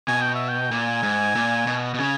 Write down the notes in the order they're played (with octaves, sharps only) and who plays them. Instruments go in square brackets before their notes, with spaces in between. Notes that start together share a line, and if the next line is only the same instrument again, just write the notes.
[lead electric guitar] B2 [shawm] G#5
[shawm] G5
E5
G5
[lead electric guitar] A#2 [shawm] G#5
[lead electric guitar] G#2
A#2
B2
B2
[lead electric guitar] C#3 [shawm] G#5